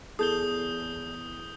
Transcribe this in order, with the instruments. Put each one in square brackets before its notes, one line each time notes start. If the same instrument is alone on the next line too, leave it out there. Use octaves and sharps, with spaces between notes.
[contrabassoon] E2 [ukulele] G#4 A4 [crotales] D#6 G6 G7